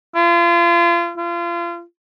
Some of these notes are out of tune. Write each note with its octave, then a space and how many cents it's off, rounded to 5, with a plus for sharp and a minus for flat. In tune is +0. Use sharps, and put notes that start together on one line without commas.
F4 -35
F4 -30